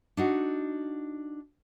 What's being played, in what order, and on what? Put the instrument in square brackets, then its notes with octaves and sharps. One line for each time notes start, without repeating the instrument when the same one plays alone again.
[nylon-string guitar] D4 D#4 F#4